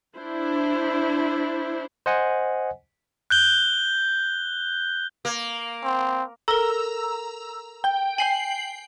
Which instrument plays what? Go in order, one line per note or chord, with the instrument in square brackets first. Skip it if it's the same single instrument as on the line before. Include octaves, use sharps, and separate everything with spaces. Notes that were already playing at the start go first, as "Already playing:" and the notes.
[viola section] D4 E4 C5
[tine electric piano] C5 D#5 F#5 G#5
[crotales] F#6 G6 G7
[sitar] A#3
[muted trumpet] C4
[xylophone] A4 A#4 [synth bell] A#5 E6
[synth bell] G5
[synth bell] G5 C7 F#7 [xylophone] G#5